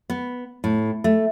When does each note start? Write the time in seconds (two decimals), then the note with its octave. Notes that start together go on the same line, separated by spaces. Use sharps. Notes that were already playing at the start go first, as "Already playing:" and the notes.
0.10 B3
0.64 A2
1.04 A3